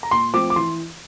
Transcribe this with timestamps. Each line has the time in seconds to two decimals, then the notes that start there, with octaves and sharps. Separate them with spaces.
0.03 A#5
0.11 A#2 C6
0.33 F3 A3 C4 D6
0.50 D6
0.56 E3 C6